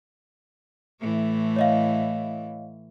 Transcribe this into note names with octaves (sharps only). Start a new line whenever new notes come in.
A2 E3 A3
C#5 D#5 F5